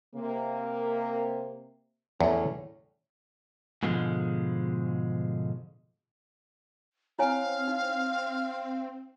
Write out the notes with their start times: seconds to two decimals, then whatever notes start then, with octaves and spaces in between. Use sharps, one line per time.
0.15 C3 A#3
2.21 E2 A2 C#4
3.83 G#2 B2 D3 F3 G3 G#3
7.19 C4 E4 C#5 F5 G#5
7.68 D#4